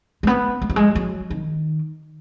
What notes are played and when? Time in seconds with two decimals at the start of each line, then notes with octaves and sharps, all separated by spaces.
0.23 G#3
0.27 B3
0.62 G#3
0.70 F#3
0.76 G#3
0.95 F#3
1.30 D#3